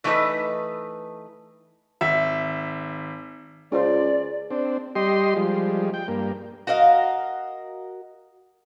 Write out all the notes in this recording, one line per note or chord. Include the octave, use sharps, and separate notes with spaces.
E3 A3 D#4 A#4 B4 D#5
G#1 E5
C#2 C#4 F4 G#4 C5 D5
C4 D4
G3 G4 D#5 C6
F3 G3 G#3
G5
G2 A#3
F#4 A#4 D#5 F5